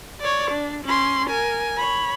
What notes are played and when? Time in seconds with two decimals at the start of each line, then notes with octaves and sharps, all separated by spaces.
0.20 C#5 D5
0.51 D4
0.85 C#4 C6
1.29 A#4 G#5
1.78 C#5 B5